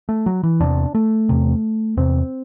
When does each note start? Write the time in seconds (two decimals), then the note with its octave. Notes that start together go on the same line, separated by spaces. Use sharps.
0.09 A3
0.26 F#3
0.43 E3
0.60 E2 C3 D4
0.95 A3
1.29 E2 C3
1.97 E2 C3 C4